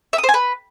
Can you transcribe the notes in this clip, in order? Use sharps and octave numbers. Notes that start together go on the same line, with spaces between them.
E5
D#6
C5
G#5
B4